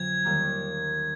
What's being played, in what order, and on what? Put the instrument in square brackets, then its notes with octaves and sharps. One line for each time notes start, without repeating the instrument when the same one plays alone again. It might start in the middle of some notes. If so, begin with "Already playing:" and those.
Already playing: [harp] F2 D3 F#3 B3 [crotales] G#6
[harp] D#2 D#3 G3 A#3